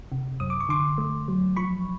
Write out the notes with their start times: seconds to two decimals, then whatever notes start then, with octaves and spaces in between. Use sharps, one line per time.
0.12 C3
0.40 F#2 D#6
0.50 D6
0.60 C#6
0.69 D3 C6 D6
0.98 A3
1.28 F#3
1.56 F3 B5 C#6